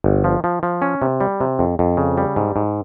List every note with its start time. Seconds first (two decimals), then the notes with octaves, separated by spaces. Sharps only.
0.04 G1
0.24 F3
0.44 F3
0.63 F3
0.82 C#4
1.02 C3
1.20 G3
1.41 C3
1.59 F2
1.79 F2
1.97 C#3
2.18 G3
2.36 G#2
2.56 G#2